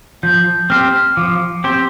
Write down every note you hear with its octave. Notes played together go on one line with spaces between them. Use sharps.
F3 G6
C4 G4 C5 F6
F3 D6
C4 G4 C5